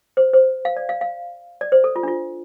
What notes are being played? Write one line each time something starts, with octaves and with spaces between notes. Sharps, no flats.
C5
C5
F5
D5
F5
F5
D5
C5
A4
F4
D4
F4